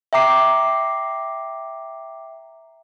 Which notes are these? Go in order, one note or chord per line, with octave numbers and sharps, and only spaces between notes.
E5 G5 A#5 D6 C7